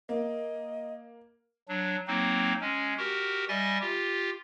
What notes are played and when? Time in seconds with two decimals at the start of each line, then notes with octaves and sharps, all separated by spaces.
0.09 A#3 D#5
1.68 F#3 D4
2.07 F#3 A#3 C4 D#4
2.61 G#3 C#4
2.98 F#4 G4 A#4
3.49 G3 D#5 E5 G#5 A6
3.81 F4 G4